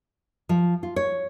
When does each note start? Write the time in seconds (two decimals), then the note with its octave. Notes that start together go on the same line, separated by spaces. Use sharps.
0.49 F3
0.83 F4
0.96 C#5